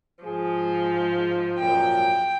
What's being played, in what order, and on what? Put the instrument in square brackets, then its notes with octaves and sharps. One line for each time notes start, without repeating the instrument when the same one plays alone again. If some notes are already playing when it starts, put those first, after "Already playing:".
[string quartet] G#2 F3 [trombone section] G#4
[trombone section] C#2 F#2 A#2 [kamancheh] G5